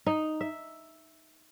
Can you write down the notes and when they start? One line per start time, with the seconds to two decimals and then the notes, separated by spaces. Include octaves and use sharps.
0.06 D#4
0.41 E5